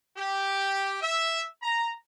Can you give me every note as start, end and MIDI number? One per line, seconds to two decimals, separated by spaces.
0.17 0.97 67
1.02 1.43 76
1.63 1.91 82